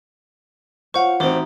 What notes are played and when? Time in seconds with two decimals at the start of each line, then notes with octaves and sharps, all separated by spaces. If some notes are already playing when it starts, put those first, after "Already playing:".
0.94 F4 C5 C#5 F5 F#5 C#6
1.20 A1 C4 D#4 F#4 A#5